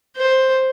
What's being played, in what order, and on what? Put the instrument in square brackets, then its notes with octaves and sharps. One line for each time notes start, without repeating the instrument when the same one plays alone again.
[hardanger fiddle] C5